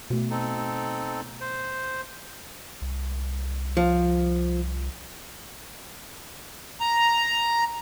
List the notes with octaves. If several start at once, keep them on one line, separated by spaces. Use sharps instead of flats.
B2 A3
C4 D#4 A4
C5
C2
F3
A#5